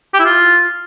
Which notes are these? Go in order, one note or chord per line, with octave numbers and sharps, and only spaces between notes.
G4
E4
F4